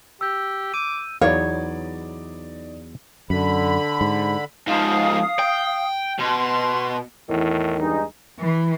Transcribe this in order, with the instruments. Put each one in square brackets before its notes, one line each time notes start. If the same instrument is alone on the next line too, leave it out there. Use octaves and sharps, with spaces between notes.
[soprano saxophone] G4 [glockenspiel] E6 G6
[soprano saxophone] D6 [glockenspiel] D#7
[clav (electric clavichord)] E2 F#3 B3 [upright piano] D#4 D5 [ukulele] C#5 [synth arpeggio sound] F5
[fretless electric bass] F#2 [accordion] D3 B5
[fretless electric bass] G#2
[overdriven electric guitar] G#2 F3 [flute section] F5 D#6
[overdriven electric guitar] G5
[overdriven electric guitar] B2 [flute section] C6
[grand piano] E2 [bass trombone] A2 [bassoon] D#3
[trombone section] G2 G#3 D#4
[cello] E3